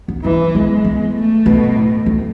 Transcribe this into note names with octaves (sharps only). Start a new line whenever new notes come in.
B3
E3 C#4
G#3 B3
B3
A3
B2 A3
A2
A3